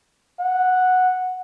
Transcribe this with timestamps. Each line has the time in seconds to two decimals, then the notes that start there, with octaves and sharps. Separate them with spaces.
0.40 F#5